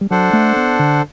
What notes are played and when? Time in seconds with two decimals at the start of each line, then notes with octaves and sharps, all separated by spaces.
0.01 G3
0.11 F#3 D4 A4 C5 F#5
0.33 A3
0.56 B3
0.79 D3